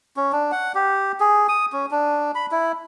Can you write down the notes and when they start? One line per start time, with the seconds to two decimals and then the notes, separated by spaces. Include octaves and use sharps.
0.17 C#4
0.32 D4
0.52 F#5
0.75 G4
1.20 G#4
1.49 D#6
1.73 C#4
1.91 D4
2.35 B5
2.52 E4